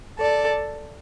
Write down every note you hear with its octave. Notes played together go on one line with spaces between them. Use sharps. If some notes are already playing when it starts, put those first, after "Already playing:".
A4 D5